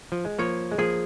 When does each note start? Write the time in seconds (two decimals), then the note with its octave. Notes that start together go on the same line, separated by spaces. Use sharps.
0.12 F3
0.25 G#3
0.39 F3 A#3 C#5
0.72 G#3
0.78 F3 A#3 G#4